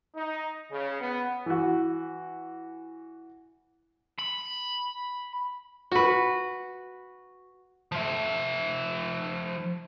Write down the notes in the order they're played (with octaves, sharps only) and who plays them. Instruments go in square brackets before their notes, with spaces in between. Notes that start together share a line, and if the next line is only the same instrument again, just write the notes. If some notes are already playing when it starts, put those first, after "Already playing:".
[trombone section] D#4
C#3
B3
[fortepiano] E3 F#4
[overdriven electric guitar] B5
[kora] F#4 B4
[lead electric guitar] F3 E5